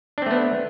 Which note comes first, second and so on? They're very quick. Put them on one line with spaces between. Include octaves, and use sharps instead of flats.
D4 C4 A3 B3